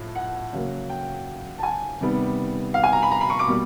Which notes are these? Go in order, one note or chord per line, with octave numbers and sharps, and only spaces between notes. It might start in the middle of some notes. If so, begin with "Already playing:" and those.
Already playing: A2 F3
F#5
C#3 F#3 A#3
G5
A5
G#5
C3 D#3 G3 B3
F5
G#5
A#5
B5
A#5
B5
C#6
D6
B2 G3 A#3